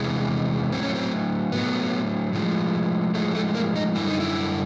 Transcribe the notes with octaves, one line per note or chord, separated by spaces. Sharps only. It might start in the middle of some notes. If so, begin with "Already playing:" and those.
Already playing: E2 C3 E3 G#3
A2 F#3 C4
C#4
C4
A2 F#3 B3
A2 F3 G#3
A2 F3 G#3 A3
A3
A#3
D#4
F#2 D3 G3 E4
D#4
E4